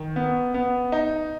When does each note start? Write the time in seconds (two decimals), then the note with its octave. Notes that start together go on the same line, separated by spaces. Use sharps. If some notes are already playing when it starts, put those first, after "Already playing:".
Already playing: D#3
0.16 B3
0.54 B3
0.92 D#4